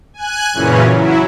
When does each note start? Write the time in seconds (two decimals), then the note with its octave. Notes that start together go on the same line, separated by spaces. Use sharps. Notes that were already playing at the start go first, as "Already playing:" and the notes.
0.14 G#5 F#6
0.53 F#2 A#2 C#3 E3 C#4
0.93 F#3 E4